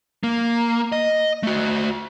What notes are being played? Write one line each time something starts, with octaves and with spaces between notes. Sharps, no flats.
A#3
D#5
A3 F#4